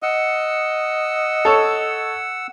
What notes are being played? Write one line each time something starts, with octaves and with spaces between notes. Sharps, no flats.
D#5 F#5 E6
A4 C#5